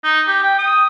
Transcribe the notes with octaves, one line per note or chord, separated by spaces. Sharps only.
D#4
G4
G5
D#6